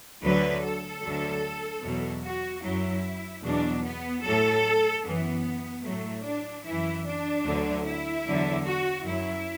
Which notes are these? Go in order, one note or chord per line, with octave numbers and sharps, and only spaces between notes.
D2 D3 F#3 B4
A4
D2 D3 F#3
E2 B2 F#3
F#4
F#2 F#3 E4
E2 B2 F#3 D4
B3
A2 F#3 A4
F#2 E3 B3
A2 F#3 A3
D4
F#2 E3 E4
D4
D2 D3 F#3
E4
E2 D3 F#3
F#4
F#2 F#3 E4